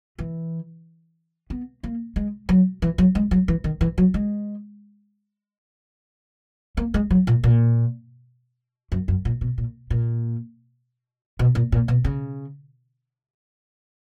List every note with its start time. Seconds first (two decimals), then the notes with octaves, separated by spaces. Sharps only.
0.18 E3
1.50 B3
1.83 A#3
2.16 G#3
2.49 F#3
2.82 E3
2.98 F#3
3.15 G#3
3.31 F#3
3.48 E3
3.64 D#3
3.81 E3
3.98 F#3
4.14 G#3
6.77 A#3
6.94 G#3
7.10 F#3
7.27 A#2
7.44 A#2
8.92 F#2
9.08 F#2
9.25 A#2
9.41 B2
9.58 A#2
9.90 A#2
11.39 B2
11.55 A#2
11.72 A#2
11.88 B2
12.04 C#3